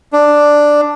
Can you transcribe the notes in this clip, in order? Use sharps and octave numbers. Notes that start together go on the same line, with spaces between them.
D4